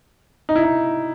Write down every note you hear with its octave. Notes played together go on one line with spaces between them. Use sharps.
D#4
E4
D#4